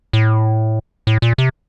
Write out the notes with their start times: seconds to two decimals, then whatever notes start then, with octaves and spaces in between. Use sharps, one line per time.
0.13 A2
1.07 A2
1.22 A#2
1.38 C3